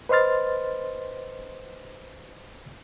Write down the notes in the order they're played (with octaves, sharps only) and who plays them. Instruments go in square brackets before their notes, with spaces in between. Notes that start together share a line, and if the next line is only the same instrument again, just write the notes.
[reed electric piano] B4 C5 D#5 C6 F6 A6